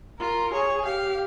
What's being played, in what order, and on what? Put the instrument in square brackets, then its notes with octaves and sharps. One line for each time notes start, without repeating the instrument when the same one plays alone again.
[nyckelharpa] F4 [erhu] A#4
[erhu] G#4 [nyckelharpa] C#5
[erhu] G4 [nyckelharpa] F5